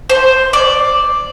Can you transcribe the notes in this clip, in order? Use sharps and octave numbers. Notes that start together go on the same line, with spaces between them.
C5
D5